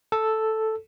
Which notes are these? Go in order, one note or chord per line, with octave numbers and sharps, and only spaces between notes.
A4